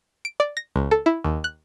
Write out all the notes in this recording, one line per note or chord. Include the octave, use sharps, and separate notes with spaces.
D7
D5
A#6
C#2
A4
E4
D#2
F#6